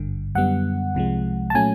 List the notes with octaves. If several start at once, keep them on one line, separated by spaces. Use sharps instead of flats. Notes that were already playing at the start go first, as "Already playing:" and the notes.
Already playing: G#1 G2 D3
F#2 D3 G3 B3 F#5
C2 C3 F3 G#3
A5
A#2 F#3 A3 C#4 G#5